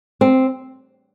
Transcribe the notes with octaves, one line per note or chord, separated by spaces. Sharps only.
C4